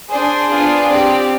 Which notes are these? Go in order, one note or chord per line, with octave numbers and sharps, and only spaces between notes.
D4 G#4 C5
B3 D4 F4 G#4
C4 G4 D5